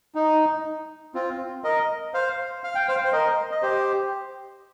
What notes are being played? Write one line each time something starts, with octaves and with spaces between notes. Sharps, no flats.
D#4
C4 F4
A#4 D#5
C5 F5
F5
G5
C5 F5
C5
A#4 D#5
D#5
G4 C5